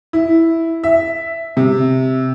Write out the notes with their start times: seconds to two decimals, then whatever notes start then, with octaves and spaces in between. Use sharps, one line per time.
0.13 E4
0.84 E5
1.57 C3